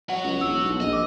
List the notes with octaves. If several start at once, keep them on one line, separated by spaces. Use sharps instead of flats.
F#4 C#5 F#5
C#2
E1 E6
B1
A#1 D#5
D6 E6